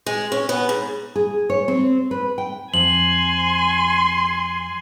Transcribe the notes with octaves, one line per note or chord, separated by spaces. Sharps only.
G#3
C#4
B3
G#2
G#4
C#5
C4
B4
G5
F2 G#5 C6 F#7